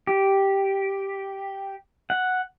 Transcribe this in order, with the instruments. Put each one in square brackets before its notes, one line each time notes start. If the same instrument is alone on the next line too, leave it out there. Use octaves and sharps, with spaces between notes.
[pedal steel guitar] G4
F#5